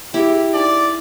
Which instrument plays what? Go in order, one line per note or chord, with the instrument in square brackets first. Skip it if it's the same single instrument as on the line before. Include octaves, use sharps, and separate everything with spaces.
[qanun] E4 [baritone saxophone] G4 [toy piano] G#4 E5 F5
[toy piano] D#4 [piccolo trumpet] D5